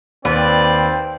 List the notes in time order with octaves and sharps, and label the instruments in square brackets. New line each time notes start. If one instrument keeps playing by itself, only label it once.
[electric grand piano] D#2 [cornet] C4 [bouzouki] B4 [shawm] D5